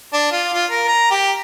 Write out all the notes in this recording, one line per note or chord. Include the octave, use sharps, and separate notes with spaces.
D4
F4
F4
A#4
A#5
G4